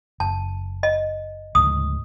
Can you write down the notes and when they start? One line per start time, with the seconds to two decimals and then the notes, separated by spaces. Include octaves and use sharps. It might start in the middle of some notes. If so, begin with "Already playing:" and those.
0.20 F#1 A5
0.83 D#5
1.55 D2 G#2 C#3 D#6